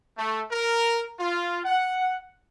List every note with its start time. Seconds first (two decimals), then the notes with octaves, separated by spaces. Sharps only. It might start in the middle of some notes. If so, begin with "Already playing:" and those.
0.17 A3
0.51 A#4
1.19 F4
1.64 F#5